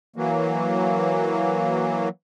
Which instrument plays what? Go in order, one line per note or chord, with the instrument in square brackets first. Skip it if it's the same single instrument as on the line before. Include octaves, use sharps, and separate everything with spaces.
[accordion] E3 F#3 A#3